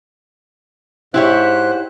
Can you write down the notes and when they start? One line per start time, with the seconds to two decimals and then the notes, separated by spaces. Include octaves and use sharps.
1.14 G#2 E4 G4 C5 C#5 F#6